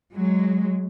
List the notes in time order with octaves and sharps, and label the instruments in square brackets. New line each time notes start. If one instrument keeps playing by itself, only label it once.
[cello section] F#3 G#3